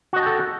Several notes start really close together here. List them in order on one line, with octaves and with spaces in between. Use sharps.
F#4 D#5 A5 G5 A4